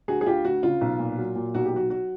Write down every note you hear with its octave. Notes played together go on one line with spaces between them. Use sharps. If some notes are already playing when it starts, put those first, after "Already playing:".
D2 F#4 G#4
G#4
D2 F4 G4
D2 F#4
C#3 F4
B1
A#2
F#3
A#2
B1 F#4
G4
F#3 F#4
F#3 F#4